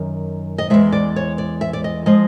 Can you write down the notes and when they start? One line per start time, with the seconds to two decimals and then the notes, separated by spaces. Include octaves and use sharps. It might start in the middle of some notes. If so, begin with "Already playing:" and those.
Already playing: F#2 D#3
0.58 D#5
0.70 E2 B2 G#3 E5
0.92 D5
1.16 C#5
1.38 D5
1.61 E5
1.73 D5
1.84 D#5
2.06 F3 G#3 D#5